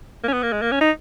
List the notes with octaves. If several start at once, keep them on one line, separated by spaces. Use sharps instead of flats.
A#3
C#4
B3
A#3
G#3
A#3
C#4
D#4